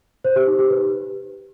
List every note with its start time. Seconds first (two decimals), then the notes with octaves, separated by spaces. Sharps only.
0.25 C5
0.36 G4
0.47 D#4
0.59 G4
0.70 B4